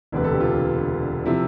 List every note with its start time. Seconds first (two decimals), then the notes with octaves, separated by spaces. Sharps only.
0.12 E1 D2 C3 B4
0.24 A4
0.32 G4
0.40 F4
1.26 C3 F3 E4